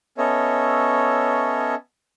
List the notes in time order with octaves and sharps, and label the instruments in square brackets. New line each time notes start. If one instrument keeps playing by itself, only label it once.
[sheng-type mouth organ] B3 C#4 A4 C#5 D#5 E5